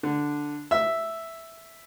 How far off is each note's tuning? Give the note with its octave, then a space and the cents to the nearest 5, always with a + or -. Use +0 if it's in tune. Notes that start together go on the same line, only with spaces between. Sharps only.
D3 +0 D4 +0
E5 +0 E6 +0